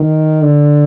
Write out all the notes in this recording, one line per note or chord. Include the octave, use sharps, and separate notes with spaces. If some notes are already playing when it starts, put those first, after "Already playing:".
Already playing: D#3
D3